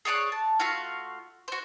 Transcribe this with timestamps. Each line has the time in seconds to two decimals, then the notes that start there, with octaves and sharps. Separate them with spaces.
0.05 G#4 C#5 D5 F#6
0.32 A5
0.60 A3 F4 F#4 F5
1.48 F#4 C5